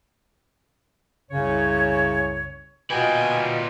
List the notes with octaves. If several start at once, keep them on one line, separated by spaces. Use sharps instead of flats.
C2 F#2 C#3 C#5
A#2 F4 F#4 B4 D#5 G5 G#5